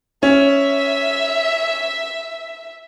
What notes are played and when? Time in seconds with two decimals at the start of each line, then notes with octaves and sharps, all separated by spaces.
0.23 C#4 E5